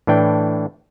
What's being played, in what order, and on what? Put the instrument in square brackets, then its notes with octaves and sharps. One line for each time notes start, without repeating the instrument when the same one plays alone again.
[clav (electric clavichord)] A2 E3 D4 G5